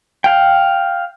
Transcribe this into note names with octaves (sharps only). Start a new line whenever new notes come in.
F5 G5